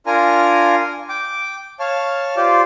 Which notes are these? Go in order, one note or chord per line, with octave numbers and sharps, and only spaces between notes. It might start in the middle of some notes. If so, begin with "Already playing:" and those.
D4 F4 A#4 G#5 A#5 F6
G5 D6
C#5 F5 A5 F6
F4 G4 C5 D5